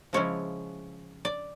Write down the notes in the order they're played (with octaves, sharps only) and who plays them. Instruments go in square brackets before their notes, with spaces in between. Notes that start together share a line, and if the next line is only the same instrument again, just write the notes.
[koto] C#3 F3 G#3 C#4 E4 C#5
D5